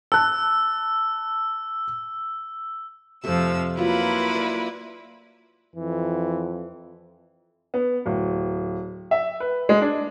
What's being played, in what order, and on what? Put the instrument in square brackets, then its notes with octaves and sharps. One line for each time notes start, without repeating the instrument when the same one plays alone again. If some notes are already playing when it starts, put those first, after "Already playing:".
[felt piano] A5 F#6 [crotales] E6
[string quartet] F2 F3 E6 [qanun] C3 A3
[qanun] F#3 F4 [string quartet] A#3 E4 B4
[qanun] D5
[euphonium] F2 [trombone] E3
[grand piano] B3
D1
E5
B4
G#3
D4